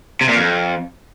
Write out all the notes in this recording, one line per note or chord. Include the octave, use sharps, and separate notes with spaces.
C3
A#2
F2